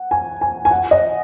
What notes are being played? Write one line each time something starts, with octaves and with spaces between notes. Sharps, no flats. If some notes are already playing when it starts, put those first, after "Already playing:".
Already playing: F#5
G#5
G#5
G#5
F#5
D#5